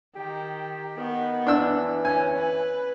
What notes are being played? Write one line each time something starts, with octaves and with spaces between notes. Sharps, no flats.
D#3 G4
D#3 B3
E3 D4 E6
C#4 G#5
B4